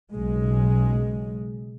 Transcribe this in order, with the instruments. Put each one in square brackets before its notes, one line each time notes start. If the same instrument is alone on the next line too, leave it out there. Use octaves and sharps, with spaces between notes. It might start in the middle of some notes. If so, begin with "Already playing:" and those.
[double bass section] B1 C#3 G#3